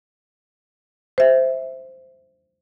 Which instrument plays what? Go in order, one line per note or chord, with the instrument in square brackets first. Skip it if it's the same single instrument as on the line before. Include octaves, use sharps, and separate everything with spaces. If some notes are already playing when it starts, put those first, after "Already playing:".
[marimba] C5 E5